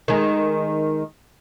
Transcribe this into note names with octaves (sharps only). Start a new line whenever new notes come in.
D#3 G#3